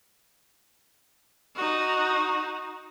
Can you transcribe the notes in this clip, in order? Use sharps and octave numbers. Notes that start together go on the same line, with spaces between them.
D#4 F#4